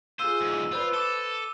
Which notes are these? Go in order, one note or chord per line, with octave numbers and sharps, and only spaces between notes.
F4 G#4 C5 E6 D#7
E2 G#2
F4 B4 C5 D5
A4 D6 G7